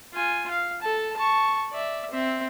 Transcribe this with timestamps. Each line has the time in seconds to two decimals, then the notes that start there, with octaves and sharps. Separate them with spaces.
0.13 F4 G#5
0.51 F5
0.82 A4 A5
1.17 A5 C#6
1.71 D5 E5
2.11 C4 E5